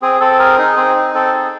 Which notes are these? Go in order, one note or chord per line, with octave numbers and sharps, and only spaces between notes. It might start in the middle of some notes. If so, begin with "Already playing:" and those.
C4 G#4
C4 A4
G#4 A#4
D#4 G#4
C4 G#4
D#4
C4 A4
G#4